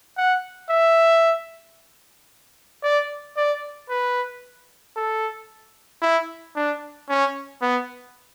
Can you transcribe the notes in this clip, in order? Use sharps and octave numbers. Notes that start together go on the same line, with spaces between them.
F#5
E5
D5
D5
B4
A4
E4
D4
C#4
B3